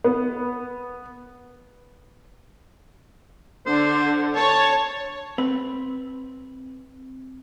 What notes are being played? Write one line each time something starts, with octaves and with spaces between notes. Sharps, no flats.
B3
D3 C5
C#5 A5
C4 B4